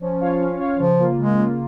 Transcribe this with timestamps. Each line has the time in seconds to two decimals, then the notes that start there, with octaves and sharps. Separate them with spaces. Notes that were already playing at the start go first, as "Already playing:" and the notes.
0.01 F3 C#4
0.21 F4 C#5 F5
0.40 C#4
0.59 F4 C#5 F5
0.79 C#3 F3
0.99 A#3 F4
1.19 C#3 G#3
1.38 A#3 F4